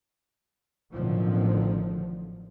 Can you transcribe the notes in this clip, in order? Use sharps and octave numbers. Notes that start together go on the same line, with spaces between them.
A1 B2 D3 D#3 F3 F#3